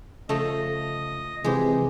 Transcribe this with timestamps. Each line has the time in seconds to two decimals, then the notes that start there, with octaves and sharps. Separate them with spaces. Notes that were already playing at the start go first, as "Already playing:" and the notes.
0.29 C#3 F3 A3 D#5
1.44 C3 E3 F3 G#3 G4 B4